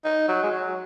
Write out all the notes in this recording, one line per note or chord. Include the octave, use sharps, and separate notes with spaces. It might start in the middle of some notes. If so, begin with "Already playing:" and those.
D#4
F#3
G#3
F#3